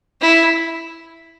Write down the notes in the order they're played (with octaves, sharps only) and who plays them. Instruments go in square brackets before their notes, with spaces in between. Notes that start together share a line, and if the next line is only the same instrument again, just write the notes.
[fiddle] E4